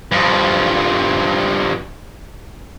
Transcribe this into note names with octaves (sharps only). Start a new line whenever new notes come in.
G2 F3